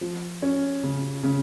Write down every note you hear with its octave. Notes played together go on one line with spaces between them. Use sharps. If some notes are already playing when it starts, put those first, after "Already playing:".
F3
C#4
C#3
C#3